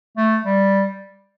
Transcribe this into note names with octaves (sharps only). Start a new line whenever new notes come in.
A3
G3